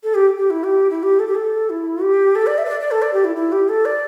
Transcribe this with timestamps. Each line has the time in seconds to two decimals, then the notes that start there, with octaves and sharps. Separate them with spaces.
0.03 A4
0.14 G4
0.36 G4
0.50 E4
0.64 G4
0.90 E4
1.03 G4
1.19 A4
1.27 G4
1.35 A4
1.70 E4
2.02 G4
2.35 A4
2.47 D5
2.58 E5
2.65 B4
2.69 D5
2.80 D5
2.91 A4
3.02 D5
3.13 G4
3.24 E4
3.36 E4
3.52 G4
3.69 A4
3.85 D5